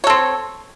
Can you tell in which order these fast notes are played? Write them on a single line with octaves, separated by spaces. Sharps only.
C#5 A4 C4